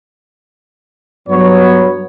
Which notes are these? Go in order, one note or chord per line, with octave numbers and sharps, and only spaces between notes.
G2 F#3 B3 C#5